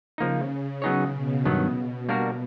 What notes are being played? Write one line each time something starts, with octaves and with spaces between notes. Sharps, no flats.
C#3 F3 A#3 D#4
F#3 B3 D#4 G#4 C#5
B2
G2 D#3 F#3 B3
B2 G3 A#3 D4 F#4 A#4